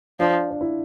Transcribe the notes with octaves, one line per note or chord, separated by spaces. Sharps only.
F3 D4
D4
E4